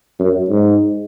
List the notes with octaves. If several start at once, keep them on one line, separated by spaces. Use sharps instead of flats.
F#2
G#2